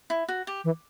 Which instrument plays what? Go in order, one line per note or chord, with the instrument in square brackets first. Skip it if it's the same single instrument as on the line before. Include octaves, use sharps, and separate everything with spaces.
[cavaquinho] E4
F#4
G4
[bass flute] E3